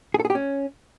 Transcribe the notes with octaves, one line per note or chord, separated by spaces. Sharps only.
G#4
A4
G#4
G4
C#4